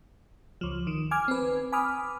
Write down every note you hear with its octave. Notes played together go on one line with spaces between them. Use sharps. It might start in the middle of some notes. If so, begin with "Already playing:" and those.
C#2 F3
D#3
G#5 D6 F6 G#6
C4 B4
G#5 B5 D6 D#6 F6